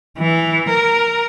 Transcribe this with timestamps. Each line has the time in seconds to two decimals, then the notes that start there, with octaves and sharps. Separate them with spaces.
0.18 E3
0.69 A#4